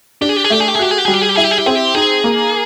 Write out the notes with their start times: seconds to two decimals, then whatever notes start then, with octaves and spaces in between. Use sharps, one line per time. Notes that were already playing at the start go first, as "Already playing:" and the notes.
0.21 D4 G4
0.29 G#4
0.36 G4
0.44 G#4
0.50 A3 G4
0.60 G#4
0.68 G4
0.75 G#4
0.79 F#4 G4
0.91 G#4
0.98 G4
1.05 G3 G#4
1.14 G4
1.22 G#4
1.29 G4
1.36 E4 G#4
1.44 G4
1.51 G#4
1.59 G4
1.66 C4 G#4
1.75 G4
1.95 D#4 G#4
2.24 A#3